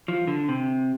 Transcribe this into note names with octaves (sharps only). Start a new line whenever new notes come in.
F3
D3
C3